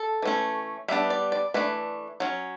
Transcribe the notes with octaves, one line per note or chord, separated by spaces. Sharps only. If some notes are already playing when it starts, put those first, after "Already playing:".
Already playing: A4
E3 A3 C#4
G3 B3 D4 E5
D5
D5
E3 A3 D4 B4
F#3 C#4